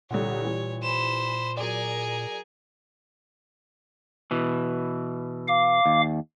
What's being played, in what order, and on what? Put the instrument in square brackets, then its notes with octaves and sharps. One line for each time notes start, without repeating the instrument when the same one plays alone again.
[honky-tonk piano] C2 D3 F#5 [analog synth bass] A#2 [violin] C#5
[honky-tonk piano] E3 G3
[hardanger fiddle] C5 [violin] B5 E7
[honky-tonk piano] F#3 D5 [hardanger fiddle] G#4 [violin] A#4 G#5
[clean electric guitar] B2 E3
[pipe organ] F5 D6
[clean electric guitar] D#2